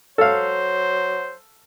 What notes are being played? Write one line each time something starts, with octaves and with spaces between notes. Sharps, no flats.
F#3 A4 C5 F5